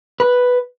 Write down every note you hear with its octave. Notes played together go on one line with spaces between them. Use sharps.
B4